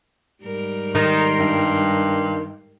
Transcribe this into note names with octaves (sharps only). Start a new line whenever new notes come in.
G#2 G3 A#4
D#3 D#4 C6
G2